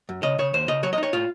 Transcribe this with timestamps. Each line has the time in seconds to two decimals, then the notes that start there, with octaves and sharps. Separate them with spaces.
0.09 F#2
0.23 C#3 D#5
0.38 C#3 C#5
0.54 D#2 C5
0.68 C#3 D#5
0.83 F#3 C#5
0.93 D#5
0.98 D#4
1.03 C#5
1.13 A2 F4